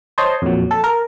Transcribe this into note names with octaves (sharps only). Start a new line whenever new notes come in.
C5 C#5 D#5 A5 C6
F2 A#2 F#3
A4 A5
A#4